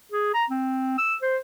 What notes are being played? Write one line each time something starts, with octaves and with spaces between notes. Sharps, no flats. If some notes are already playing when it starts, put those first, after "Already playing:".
G#4
A#5
C4
E6
C5